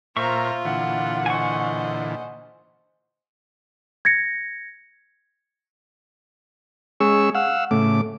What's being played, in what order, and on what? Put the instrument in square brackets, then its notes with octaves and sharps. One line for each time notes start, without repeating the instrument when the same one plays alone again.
[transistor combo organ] A#2 A#4 [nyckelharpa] F4 [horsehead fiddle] C5 A#5 [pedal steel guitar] E5 C#6
[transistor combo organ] A#2 D3 E3 [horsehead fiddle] F#5
[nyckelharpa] C5 D#5 [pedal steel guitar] G#5 C#6
[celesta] G#6 A#6 C#7
[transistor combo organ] G#3 C#4 G#4 C#6 E6
F5 F#5 E6
A2 C#3 A3 D6